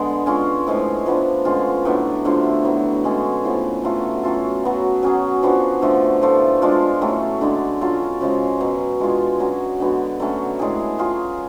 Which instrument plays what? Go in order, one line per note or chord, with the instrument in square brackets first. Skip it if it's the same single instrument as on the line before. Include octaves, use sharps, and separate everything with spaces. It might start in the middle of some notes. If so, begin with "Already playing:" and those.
Already playing: [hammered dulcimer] D3 G#3 B3
G#3 C#4 F4
A2 F3 G#3
F3 B3 D4
D3 G#3 C#4 F4
A2 F#3 B3 D4
D3 F3 A3 F4
A2 F#3 B3
D3 G#3 C#4 G#4
A2 F3 B3
F#3 A3 F4
F#3 C#4 F4 A4
F#3 B3 F#4
F#3 C#4 G#4
F3 B3 D4 F#4
D3 F3 A3
A2 F3 A3 F4
G#3 D4 F4 A4
A2 F#3 A3 C#4
D3 G#3 D4
F#3 C#4 F4 A4
C#3 F3 G#3 C#4
B2 F#3 C#4
G#3 D4 F4 G#4
F#3 C#4 F#4
D3 G#3 B3 F#4
D3 F#3 A3 C#4
A2 G#3 D4 G#4
F#3 C#4 F4 G#4